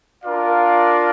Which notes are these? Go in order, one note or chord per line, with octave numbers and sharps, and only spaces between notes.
D4 F4 A#4 D5 F5